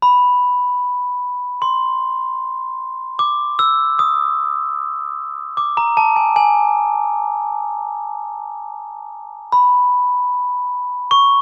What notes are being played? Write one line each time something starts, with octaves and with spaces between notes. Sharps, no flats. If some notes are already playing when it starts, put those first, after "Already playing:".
B5
C6
D6
E6
D#6
D6
A#5
A5
G#5
G#5
B5
C#6